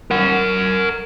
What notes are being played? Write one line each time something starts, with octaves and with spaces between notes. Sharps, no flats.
A#4 F#5